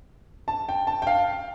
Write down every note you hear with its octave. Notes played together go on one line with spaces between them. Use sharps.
A5
G5
A5
G5
F5